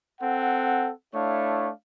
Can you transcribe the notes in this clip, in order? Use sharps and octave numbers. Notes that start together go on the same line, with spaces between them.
C4 A4 F#5
A3 D4 E4 C#5 F5